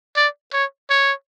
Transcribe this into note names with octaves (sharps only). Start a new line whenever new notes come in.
D5
C#5
C#5